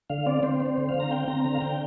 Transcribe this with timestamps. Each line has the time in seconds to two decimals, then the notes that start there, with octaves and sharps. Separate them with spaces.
0.10 D3 F5
0.26 C4 D5
0.43 C4 C5
0.60 C4
0.66 C5
0.78 D3
0.89 F5
0.94 D3
1.00 A#5
1.11 C4 G5
1.28 C4 A#5
1.44 D3 A#5
1.55 F5
1.61 D3 G5